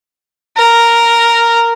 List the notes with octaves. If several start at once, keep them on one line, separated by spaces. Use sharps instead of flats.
A#4